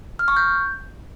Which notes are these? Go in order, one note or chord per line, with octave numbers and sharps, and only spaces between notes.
F6
C#6
G6